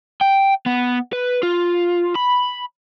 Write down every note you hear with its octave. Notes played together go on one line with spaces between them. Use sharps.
G5
B3
B4
F4
B5